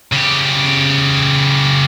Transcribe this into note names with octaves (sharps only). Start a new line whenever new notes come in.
C#3 G4